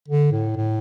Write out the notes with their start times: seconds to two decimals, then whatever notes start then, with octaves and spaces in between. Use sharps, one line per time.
0.08 D3
0.32 A2
0.56 A2